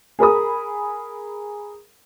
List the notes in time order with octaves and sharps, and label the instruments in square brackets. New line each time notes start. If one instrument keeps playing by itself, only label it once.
[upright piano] G#4 A#4 B5 D#6